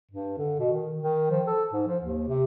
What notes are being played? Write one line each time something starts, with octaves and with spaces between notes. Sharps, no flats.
G2
D3
B2
D#3
D#3
F3
A4
G#2
F3
D#2
C3